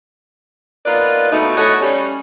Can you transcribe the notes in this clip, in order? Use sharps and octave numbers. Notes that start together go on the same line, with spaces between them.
A#3 B3 D#4 F4 B4 D5
B2 A3 D#4
A3 E4 F#4 C#5 D#5 F#5
G3 C#4